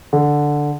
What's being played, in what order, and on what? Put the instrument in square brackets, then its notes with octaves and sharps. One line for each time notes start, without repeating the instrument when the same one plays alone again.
[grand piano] D3